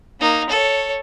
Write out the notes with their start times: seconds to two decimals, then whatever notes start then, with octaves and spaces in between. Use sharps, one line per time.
0.20 A#3 D#4
0.50 A4 C#5